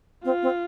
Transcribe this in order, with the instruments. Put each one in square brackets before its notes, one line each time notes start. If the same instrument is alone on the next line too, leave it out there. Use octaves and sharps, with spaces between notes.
[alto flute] C4 [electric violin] F4
[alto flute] C4